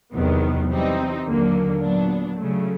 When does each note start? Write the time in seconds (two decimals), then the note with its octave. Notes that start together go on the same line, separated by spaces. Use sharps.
0.14 E2 C3 D#3 F#3 B3
0.70 E3 G3 C4 D#4
1.26 D#2 D3 F#3 A#3
1.81 A#2 F#3 B3 D4
2.38 C#3 F#3 A3